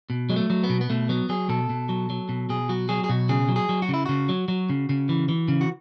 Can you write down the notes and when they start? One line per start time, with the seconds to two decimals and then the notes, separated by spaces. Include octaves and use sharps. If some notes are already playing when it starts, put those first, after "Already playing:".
0.10 B2
0.30 F#3 G#3
0.36 A3
0.50 F#3
0.64 B3
0.69 B2
0.81 B3
0.90 B2 A3
1.09 F#3 B3
1.29 F#3 G#4
1.49 B2 A4
1.70 B2
1.89 F#3
2.10 F#3
2.29 B2
2.49 B2 G#4
2.69 F#3 F#4
2.89 F#3 G#4
3.04 G#4
3.09 B2 F#4
3.29 C#3 G#4
3.49 F#3
3.56 G#4
3.69 F#3
3.82 F#4
3.89 C#3
3.94 E4
4.06 C#3 F#4
4.29 F#3
4.48 F#3
4.69 C#3
4.89 C#3
5.09 E3
5.29 E3
5.48 C#3
5.61 F#4